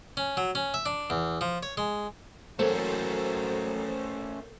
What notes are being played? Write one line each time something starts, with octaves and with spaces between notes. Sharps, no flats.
C#4
F#3
C#4
E5
D4
E2
F3
C#5
G#3
F#3 A3 A#3 C#4 A4 C5